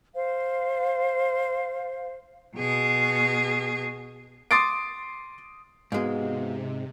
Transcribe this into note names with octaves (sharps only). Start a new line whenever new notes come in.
C5 F5
B2 G#4
C6 D6 D#6 A6 C7 D7
G#2 C3 G#3 B3 F#4 F5